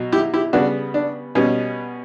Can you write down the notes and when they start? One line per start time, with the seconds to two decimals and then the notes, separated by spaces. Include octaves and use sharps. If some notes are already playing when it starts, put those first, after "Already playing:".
Already playing: B2 F#3
0.12 E4 G4
0.34 E4 G4
0.53 C#3 G3 B3 D4 F#4
0.94 D4
1.35 B2 G3 B3 C#4